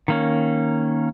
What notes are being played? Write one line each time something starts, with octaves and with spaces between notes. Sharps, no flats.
D#3 A#3 C#4